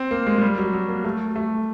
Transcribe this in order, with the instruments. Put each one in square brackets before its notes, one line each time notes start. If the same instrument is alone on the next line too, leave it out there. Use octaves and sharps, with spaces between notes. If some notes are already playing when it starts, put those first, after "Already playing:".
Already playing: [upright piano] C4
A#3
G#3
G#3
G3
F#3
F#3
A#3
A3
A3